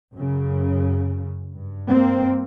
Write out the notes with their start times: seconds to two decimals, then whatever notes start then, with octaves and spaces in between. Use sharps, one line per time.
0.14 F#2
0.19 C#3
1.54 G2
1.90 A#3 C4